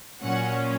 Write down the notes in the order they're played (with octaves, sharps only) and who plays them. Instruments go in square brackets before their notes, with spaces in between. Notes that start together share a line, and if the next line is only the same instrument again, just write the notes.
[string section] A#2 F#3 C#4 F#5